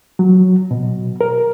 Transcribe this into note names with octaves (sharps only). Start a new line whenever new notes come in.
F#3
B2
A#4